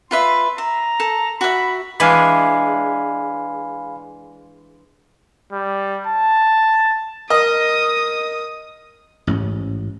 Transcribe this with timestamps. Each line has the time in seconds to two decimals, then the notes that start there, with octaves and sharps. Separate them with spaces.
0.11 F4 B4 E5 C6
0.58 E5 A#5
1.00 A4
1.41 F#4 E5 B5
2.00 E3 G#3 D4 F5 G#5 B5
5.52 G3
6.07 A5
7.30 A#4 D#5 D#6
9.27 A1 G#2 C#4